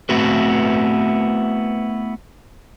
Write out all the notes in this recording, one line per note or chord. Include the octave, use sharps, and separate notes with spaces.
A3 B3 C4 E4 F#4 B4